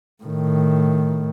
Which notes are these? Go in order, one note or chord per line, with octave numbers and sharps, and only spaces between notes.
A2 D#3